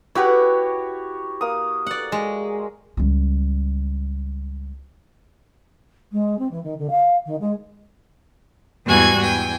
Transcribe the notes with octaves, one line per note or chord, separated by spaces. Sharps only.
E4 F#4 G4 B4 C#5
A#3 D#6
D5 F#5
G#3
C#2 G3
G#3
C4
E3
D#3
D3
F5
D#3
G#3
E2 G#2 G3 F#4 G#5 G#6
E2 G5 G#5